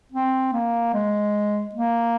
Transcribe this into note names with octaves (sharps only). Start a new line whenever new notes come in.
C4
A#3
G#3
A#3